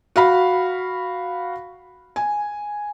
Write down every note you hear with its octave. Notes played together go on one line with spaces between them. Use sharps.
F#4 F5 B5
G#5